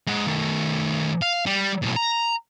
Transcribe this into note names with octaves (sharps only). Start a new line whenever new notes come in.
G#3 F#5
D#3 A3
F5
G3
B1 A2
A#5